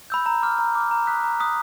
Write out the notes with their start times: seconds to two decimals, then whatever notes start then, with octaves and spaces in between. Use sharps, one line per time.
0.10 B5 E6 G6
0.26 A#5
0.42 D6 F6
0.59 A#5
0.75 D6 F6
0.91 A#5
1.07 D#6 F#6 B6
1.24 A#5
1.40 D#6 F#6 B6